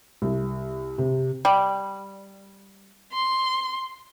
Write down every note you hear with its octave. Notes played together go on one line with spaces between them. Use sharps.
C2
C3
G3
C6